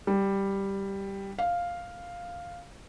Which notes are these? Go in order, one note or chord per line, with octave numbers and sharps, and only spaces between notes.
G3
F5